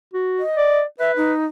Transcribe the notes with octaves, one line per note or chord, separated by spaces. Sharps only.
F#4
D#5
D5
B4 E5
D#4